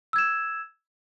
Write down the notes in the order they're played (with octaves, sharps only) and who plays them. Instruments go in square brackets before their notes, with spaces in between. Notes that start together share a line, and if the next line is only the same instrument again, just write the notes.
[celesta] E6
G#6
E7